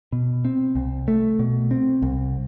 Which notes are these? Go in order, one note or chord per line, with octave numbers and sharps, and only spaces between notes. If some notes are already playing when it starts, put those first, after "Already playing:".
B2
C4
C2
A3
B2
C4
C2